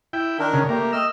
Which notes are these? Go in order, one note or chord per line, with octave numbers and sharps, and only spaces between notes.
E4 G5
D#3 D4 A#4
C#3
A3 A#3 G4
D#5 E6 F6